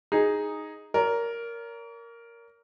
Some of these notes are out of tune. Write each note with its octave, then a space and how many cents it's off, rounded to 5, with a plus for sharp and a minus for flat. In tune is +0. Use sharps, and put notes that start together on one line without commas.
D#4 +0 G#4 -5
A#4 +0 C#5 +45